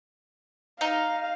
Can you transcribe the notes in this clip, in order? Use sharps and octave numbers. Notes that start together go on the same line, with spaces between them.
D#4 F5